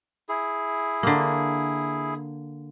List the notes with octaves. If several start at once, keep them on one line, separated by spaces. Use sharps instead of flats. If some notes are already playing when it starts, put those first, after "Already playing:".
E4 G#4
D3 A#3